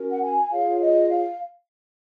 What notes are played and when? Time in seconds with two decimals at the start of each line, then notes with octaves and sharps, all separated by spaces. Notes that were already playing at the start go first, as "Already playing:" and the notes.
Already playing: C#4 F#4 A#4
0.10 F#5
0.22 G#5
0.51 F4 G#4 C#5 F5
0.81 D#5
1.10 F5